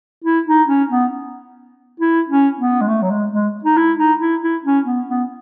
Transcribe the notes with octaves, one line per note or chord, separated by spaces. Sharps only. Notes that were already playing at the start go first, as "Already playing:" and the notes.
E4
D#4
C#4
B3
E4
C#4
B3
G#3
A3
F#3
G#3
G#3
D#4
E4
D#4
E4
E4
C#4
B3
B3